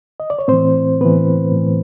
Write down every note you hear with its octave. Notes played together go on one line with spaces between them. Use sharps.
D#5
D5
C#5
A2 E3 C4 C5
A2 E3 B3 B4
A2
E3